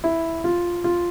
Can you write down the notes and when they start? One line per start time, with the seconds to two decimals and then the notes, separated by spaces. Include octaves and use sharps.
0.04 E4
0.44 F4
0.84 F4